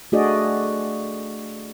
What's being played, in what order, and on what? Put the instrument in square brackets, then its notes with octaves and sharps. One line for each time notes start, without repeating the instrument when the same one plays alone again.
[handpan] A3 D4 F#4 G#4 D5 D#5